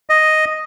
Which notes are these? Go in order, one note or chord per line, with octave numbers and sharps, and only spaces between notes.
D#5